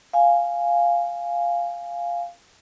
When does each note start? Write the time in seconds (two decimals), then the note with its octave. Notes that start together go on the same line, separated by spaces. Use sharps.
0.13 F5 G#5